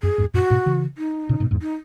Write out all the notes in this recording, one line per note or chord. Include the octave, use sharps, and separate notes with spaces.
F#2 G#4
E2 G#2
F#2 A#2 F#4
G#2 B2
C#3 E3
D#4
A#2 C#3
G#2 B2
E2 G#2
D#4